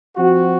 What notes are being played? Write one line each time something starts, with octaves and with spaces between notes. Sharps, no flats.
F3 C4 F#4